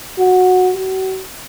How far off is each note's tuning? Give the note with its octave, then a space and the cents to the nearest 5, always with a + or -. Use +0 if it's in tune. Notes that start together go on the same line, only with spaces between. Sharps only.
F#4 -10
F#4 +35